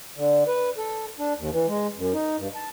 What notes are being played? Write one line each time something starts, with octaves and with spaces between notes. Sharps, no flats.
D3
B4
A4
D4
D#2
E3
G#3
F#2
D#4
G2
A5